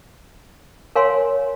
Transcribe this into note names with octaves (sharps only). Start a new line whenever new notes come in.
A#4 C#5 F5 G#5 C6